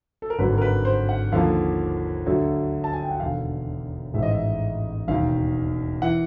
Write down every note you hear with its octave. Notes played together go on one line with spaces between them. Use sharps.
A4
A#4
G#1 G2 D3 F#3 B4
A#4
B4
C5
F#5
D#2 D3 F3 A#3 F5
D2 D3 F#3
A5
G#5
G5
F#5
E1 D#2 D3 F5
A1 G#2 D#3 G#3 E5
D#5
E5
E1 D#2 D#3 F5
E3 F#5